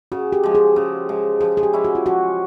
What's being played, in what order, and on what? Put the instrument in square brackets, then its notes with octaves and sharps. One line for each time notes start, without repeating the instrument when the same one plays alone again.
[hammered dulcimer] C#3 [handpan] F#4
[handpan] G4
[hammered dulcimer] F3 G#3
[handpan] G#4
[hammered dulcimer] C#3 [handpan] G#4
[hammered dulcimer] F3 G#3
[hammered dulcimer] F3 [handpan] G#4
[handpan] G#4
G4
[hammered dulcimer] G#3 C#4 E4
[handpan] F#4
F4
[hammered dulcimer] F3 [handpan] F#4